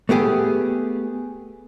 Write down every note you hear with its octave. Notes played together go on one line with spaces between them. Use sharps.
A3 B3 G4 G#4